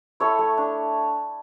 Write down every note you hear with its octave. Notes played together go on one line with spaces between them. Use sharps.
E4 A4 C#5
A3
D4